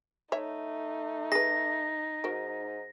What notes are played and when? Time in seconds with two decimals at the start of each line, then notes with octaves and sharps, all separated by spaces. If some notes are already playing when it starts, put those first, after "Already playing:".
0.32 A3 D#4 C#5 E5
1.32 G#4 B4 A#6
2.24 G#2 F#4 A#4